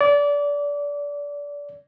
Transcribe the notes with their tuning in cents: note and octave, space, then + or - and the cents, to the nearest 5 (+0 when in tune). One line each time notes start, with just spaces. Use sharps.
D5 -25